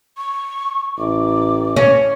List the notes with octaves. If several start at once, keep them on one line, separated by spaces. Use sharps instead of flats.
C#6
A1 D6
C#4